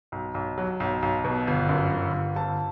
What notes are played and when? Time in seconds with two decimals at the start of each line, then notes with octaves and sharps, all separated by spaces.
0.12 B1
0.34 B1
0.58 F#3
0.80 B1
1.02 B1
1.24 B2
1.47 G1
1.69 F#2
1.91 G1
2.14 G1
2.36 G1 A5